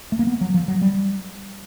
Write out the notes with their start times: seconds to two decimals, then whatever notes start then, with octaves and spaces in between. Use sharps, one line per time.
0.12 A3
0.19 A#3
0.27 B3
0.41 F#3
0.54 F3
0.68 F#3
0.82 G3